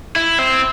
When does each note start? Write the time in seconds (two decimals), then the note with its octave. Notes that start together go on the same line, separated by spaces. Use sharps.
0.16 E4
0.39 C4